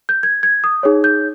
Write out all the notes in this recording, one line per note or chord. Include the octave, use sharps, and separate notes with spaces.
G6
G#6
G#6
D#6
D#4 G#4 C#5
G6